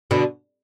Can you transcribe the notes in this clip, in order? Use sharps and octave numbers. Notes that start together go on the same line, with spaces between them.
B2 D3